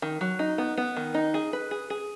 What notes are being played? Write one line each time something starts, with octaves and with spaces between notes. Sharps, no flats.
D#3
F#3
D#4
B3
B3
D#3
D#4
G#4
B4
G#4
G#4